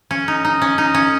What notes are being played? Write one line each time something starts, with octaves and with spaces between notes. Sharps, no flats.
C#4
D#4
D#4
C#4
D#4
C#4